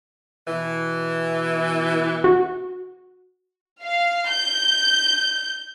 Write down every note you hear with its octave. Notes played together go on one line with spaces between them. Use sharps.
B2 E3
F#4
F5
G6